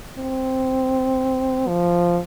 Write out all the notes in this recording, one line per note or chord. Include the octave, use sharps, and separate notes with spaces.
C4
F3